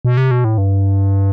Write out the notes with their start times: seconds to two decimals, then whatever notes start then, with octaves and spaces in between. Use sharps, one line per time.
0.05 B2
0.17 C3
0.31 B2
0.44 A2
0.58 G2